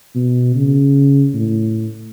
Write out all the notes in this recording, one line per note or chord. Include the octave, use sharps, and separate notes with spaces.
B2
C#3
A2